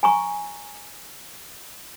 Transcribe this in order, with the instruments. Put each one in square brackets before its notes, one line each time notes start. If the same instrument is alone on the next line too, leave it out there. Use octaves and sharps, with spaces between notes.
[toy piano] G#5 A#5 C#6